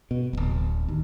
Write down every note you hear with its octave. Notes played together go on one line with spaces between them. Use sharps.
B2
D1 G#1
D#2